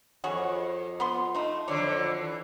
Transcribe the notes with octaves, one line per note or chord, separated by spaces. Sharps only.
F2 F#4 G#4 C#5
B3 B4 C6
A3 D#4 F4
F2 D3 F#3 C#5 D5
E3